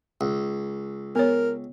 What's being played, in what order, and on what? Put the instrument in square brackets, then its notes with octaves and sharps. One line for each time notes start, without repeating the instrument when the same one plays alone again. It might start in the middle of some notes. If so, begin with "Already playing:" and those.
[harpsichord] C#2
[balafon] B3 C#5 [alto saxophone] A#4